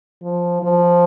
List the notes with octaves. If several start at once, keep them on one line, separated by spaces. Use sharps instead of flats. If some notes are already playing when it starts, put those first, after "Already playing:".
F3
F3